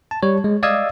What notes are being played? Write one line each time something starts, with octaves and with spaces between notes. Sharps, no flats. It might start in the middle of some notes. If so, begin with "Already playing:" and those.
A5
G3 C#5
G#3
D5 D#5 F5 D#6 E6 G#6